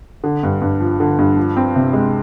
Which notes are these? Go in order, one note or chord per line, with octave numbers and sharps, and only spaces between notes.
D3
G2
G2
F3
D3
G2
F3
C4
C3
G#3